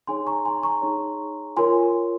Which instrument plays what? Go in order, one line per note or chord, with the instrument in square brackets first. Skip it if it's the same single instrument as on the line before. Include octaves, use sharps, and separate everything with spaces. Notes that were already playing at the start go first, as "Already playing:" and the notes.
[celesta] D#4 G#4 C#5 G#5 C6
A#5 C#6
G#5 C6
A#5 C#6
D#4 G#4 C#5
F4 A#4 C#5 G#5 C6